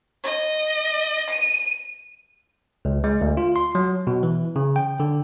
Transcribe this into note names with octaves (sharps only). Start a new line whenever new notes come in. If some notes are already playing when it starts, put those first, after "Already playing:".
D#5
D#7
C#2
G#3
D2
F4
C6
F#3
B2
E3
C#3
G5
D3